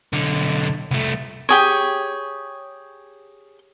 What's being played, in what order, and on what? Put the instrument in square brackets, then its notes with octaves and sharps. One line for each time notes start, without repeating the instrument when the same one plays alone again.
[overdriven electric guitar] B1 D3
C2 A3
[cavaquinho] G4 G#4 C#5